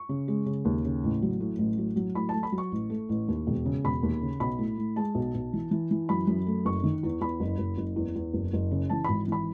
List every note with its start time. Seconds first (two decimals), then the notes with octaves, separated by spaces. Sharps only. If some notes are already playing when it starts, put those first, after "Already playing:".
Already playing: C#6
0.09 C#3
0.28 G#3
0.46 C#3
0.65 D#2
0.85 C#3
1.04 A1
1.22 F#3
1.40 A2
1.59 A1
1.78 F#3
1.96 F#3
2.15 A2 B5
2.29 A3 A5
2.43 B5
2.52 F#3
2.58 C#6
2.72 A1
2.90 A3
3.09 A1
3.28 D#2
3.47 E1
3.65 C#3
3.84 E1 B5
4.03 D#2
4.21 C#3
4.40 B1 B5
4.58 A2
4.78 A2
4.96 G#3 A5
5.15 B1
5.34 B1
5.53 E3
5.71 E3
5.91 E3
6.09 F#2 B5
6.27 F#2
6.46 A3
6.65 F#1 C#6
6.83 D#3
7.03 E2
7.21 E2 B5
7.40 F#1
7.58 F#1
7.77 F#1
7.96 E2
8.16 E2
8.34 F#1
8.53 F#1
8.71 C#3
8.90 E3 A5
9.04 G#1 B5
9.28 E3 B5